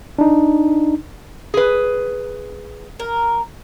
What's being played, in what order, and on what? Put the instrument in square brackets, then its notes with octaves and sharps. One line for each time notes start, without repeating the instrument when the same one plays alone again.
[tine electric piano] D4 D#4
[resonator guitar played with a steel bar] G#4 B4
[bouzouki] A#4